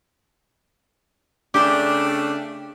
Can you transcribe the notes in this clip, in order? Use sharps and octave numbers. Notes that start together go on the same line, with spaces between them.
C#3 A3 D4 G4